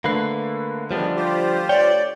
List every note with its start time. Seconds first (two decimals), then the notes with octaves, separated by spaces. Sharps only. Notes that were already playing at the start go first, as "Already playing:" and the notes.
0.04 D3 A3 A#3 B4 C7
0.91 D#3 F3 G3 G#3 B3 D4
1.16 F4 G4 C5
1.69 C#5 D5 G5